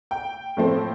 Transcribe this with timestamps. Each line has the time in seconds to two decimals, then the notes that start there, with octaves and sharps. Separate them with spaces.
0.11 G5
0.57 A2 F3 A3 C4